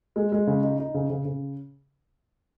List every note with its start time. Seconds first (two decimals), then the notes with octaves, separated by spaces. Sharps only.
0.16 G#3
0.32 G#3
0.47 C#3
0.63 D#4
0.78 D#4
0.94 C#3
1.10 C#3
1.25 C#3